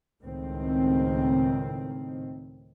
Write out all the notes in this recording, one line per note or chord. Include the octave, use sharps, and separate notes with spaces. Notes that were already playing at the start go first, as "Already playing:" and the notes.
C#2 A2 D#3 C4